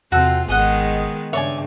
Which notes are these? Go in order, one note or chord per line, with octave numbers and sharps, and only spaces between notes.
E2 C3 C4 F4 F#4 A4 E6
G#1 D#3 G#3 B3 G#4 D#5 F#5
G2 C#3 C#5 D5 E5 G#5